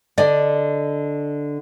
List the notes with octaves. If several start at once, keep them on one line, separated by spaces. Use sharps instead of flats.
D3 D5 D#5